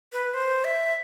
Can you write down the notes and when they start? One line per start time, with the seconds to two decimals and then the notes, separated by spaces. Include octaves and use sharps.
0.13 B4
0.34 C5
0.64 E5